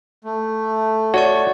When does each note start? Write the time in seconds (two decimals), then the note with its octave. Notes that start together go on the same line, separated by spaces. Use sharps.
0.25 A3
1.14 F#4 C#5 D5 C#6